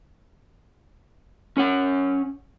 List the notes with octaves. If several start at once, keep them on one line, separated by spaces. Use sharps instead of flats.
C#4 C#5 F#5